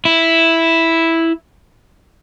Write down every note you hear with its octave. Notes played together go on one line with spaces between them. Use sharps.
E4